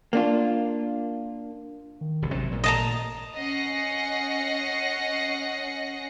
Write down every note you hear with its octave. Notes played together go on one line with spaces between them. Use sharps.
A#3 D4 F4
D#3
E1 C2
A1 C3 F#3 G#3
A#2
D#5 A5 A#5
C#4 D#5 F#5 A#6 C7 C#7